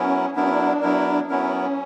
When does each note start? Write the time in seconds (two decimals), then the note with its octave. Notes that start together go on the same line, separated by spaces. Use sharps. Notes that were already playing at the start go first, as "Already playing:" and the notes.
Already playing: F#3 B3 C#4 E4 A#4
0.35 F#3 B3 D4 E4 A#4
0.43 C#4
0.51 D4
0.82 F#3 B3 E4 A#4
1.30 F#3 B3 C#4 E4 A#4